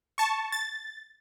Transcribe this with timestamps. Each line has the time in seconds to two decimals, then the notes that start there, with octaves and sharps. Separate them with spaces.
0.18 A5 C#6
0.52 A6